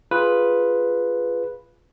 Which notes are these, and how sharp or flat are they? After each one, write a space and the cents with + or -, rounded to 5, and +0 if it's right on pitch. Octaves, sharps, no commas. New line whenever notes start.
F4 +0 G#4 +5 B4 +0